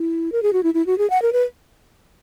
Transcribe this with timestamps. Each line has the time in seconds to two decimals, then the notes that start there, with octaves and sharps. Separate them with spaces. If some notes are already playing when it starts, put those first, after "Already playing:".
Already playing: E4
0.32 A#4
0.43 G#4
0.53 F#4
0.63 E4
0.74 E4
0.86 F#4
0.98 G#4
1.10 F#5
1.22 A#4
1.33 B4